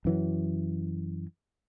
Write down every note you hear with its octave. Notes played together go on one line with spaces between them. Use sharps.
F#2 E3 F#3